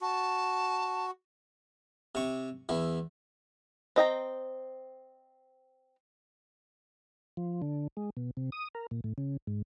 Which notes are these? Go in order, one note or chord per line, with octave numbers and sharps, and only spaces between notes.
F#4 A5
C3 C#6
E2 E3
C4 D#5 G5 A#5
F3
D3
G#3
B2
C3
D#6
A#4
A#2
A2
C#3
G#2